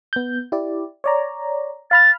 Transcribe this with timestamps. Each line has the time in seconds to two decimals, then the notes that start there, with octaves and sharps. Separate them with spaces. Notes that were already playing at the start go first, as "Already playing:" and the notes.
0.13 B3 G6
0.52 E4 G4 D5
1.04 C#5 D5 A#5
1.91 F5 B5 F6 A6